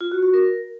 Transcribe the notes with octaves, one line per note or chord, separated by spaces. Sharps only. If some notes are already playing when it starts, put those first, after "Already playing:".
F4
F#4
F#4
A#4